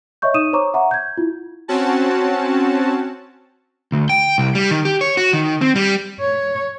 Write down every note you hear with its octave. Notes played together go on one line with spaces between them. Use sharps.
C#5 D#5 E5 C#6 G6
D#4 D#6 D#7 E7
C5 C#5 A#5 C#6 D6
E5 F#5 A#5 C#6
G6 G#6
E4 F4
C4 C#4 F#4 A5
D2
G5
C2
G3
D#3
G4
C#5
F#4
D#3
C4
G3
C#5